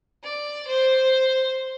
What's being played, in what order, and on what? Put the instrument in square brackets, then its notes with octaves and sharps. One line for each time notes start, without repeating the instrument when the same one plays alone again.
[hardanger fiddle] D5
C5